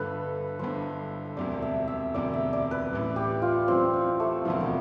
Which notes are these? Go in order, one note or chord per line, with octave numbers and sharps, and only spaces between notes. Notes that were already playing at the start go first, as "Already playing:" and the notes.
Already playing: G1 G2 D3 A4 B4
G1 G2 D3 C5
E1 D2 C3 D5
E5
E5
E1 D2 C3 D5
E5
D5
B4
A1 A2 E3
G4
F4
A1 A2 E3 C4
C4
A3
E1 D2 C3 F3 B3
B3